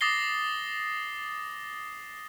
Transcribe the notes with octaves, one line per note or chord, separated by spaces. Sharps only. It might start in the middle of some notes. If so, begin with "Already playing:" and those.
D6 D#6 A6 A#6 C7 G7